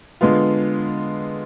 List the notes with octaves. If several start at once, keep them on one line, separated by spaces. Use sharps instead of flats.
D3 G#3 B3 F4